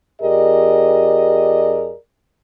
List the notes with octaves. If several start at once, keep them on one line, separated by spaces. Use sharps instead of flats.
F2 G4 G#4 A#4 D5 D#5